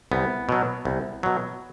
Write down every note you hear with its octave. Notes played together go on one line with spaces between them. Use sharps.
C2 B3
B2 F#3
C2
B2 F#3